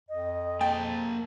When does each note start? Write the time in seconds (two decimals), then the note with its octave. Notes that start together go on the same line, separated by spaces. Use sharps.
0.09 F2 D#5
0.61 A#3 G5 A5